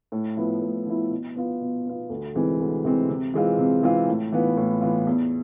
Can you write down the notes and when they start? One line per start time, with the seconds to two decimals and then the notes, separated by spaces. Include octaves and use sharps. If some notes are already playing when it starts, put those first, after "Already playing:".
0.12 A2
0.37 F3 B3 E4
0.62 A2
0.86 F3 B3 E4
1.11 B2
1.36 B3 F4
1.61 B2
1.85 B3 F4
2.10 D2
2.35 C3 E3 G#3 C4
2.60 D2
2.84 C3 E3 G#3 C4
3.09 C3
3.34 E3 G#3 C4 F4
3.58 C3
3.83 E3 G#3 C4 F4
4.08 A2
4.32 E3 B3 F4
4.57 A2
4.81 E3 B3 F4
5.07 E2